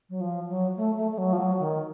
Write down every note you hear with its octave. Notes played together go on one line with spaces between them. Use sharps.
F#3
F3
F#3
A3
A3
A3
F#3
F3
F#3
D#3